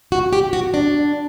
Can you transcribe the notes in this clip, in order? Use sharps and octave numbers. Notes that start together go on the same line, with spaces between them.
F#4
G4
F#4
D4